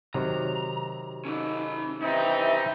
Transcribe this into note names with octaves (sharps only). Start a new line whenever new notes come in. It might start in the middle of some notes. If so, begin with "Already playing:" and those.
C3 D#3 F#3 A#5
C#4 D#4 A4
E3 C4 D4 D#4 G4 E5